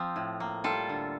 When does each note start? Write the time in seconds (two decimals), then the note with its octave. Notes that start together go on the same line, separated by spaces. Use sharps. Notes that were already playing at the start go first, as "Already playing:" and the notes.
Already playing: F3 C4
0.16 A2
0.40 A#3
0.64 G3 F4 A4
0.89 D3